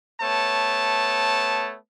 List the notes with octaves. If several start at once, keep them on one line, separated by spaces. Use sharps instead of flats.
A3 B3 C#5 A5